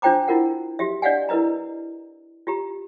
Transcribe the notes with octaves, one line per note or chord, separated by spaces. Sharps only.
D4 F4 C5 G5 A#5 D6
E4 F4 A#4 F#5
F#4 G4 E5
D4 D5 D#5 F5 F#5 G#5
E4 A#4 B4 D#5 A#5
F4 G4 A#5